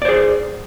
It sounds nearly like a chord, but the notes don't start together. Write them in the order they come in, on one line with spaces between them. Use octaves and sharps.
D5 C5 G#4